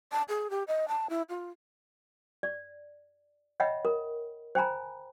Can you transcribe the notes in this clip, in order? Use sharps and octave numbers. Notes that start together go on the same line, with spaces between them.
A5
G#4
G4
D#5
A5
E4
F4
D5
C#5 D#5 E5 F#5 G5 B5
A#4
C5 G5 G#5 A#5 B5